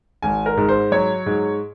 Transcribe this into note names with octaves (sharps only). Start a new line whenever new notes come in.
G#1 G#5
A#4
G#2
C5
F#3 C#5
G#2